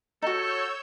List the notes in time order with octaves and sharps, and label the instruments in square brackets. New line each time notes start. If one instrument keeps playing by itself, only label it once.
[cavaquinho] D#4 F#4 [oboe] A4 [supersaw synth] C#5 E6 G6